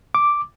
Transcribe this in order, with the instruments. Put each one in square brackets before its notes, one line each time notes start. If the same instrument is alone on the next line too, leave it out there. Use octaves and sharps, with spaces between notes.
[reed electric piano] D6